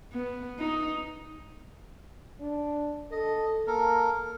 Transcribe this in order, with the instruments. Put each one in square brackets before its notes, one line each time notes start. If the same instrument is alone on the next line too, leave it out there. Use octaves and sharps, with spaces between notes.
[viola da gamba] B3
D#4
[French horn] D4
[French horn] A4 [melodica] D#5
[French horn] A#3 [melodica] A4 A#4